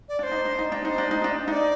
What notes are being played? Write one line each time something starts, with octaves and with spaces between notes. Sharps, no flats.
D5
D4 C5 D5
D#4
D4
D#4
D4
D#4 C5
D4
D#4
D4
D#4 D5 E5